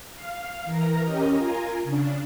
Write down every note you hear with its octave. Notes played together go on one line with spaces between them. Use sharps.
F5
E3 A#4 A#5
C#4 G4 A#4 D#5
F4 A#4 G#5 A#5
C#3 D4